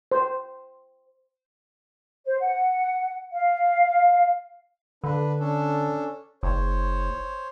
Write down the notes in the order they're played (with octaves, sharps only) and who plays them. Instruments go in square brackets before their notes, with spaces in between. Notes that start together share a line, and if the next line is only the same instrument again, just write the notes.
[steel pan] C5
[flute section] C5
F#5
F5
[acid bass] D3 [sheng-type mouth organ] D4 B4
[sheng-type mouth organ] C#4 D4 A4
[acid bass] F#1 [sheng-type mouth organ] C5 C#5